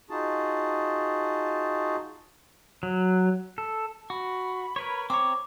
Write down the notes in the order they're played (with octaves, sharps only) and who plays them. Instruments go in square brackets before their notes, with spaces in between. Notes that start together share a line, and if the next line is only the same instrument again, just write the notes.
[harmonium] D#4 F4 F#4 G#4 A5
[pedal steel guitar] F#3
A4
[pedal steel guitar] F#4 [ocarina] B5
[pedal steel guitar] A#4 B4 C#5
[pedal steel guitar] C4 C#5 [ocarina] A#5 [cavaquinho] D6